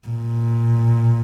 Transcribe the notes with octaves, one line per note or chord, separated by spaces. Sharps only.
A#2